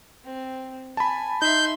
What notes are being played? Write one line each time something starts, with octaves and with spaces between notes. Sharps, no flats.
C4
G#5 A5 B5
D#4 E5 C6 G6